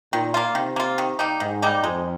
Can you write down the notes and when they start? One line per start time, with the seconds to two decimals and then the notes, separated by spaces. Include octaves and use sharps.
0.12 A#2 D#3
0.34 A#3 F4
0.55 C3 D#3
0.76 A#3 F4
0.98 D#3
1.19 G3 A#3 D#4
1.40 G#2 D#3
1.62 G3 A#3 D#4
1.84 F2 G#3